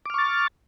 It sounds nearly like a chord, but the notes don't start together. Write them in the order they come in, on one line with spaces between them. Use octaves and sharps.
D6 F6 C#6 A6